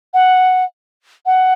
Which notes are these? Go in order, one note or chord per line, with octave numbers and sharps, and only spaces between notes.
F#5
F#5